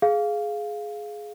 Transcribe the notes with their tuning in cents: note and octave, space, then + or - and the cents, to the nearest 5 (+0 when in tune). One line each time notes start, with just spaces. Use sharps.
G#4 +15 F5 +0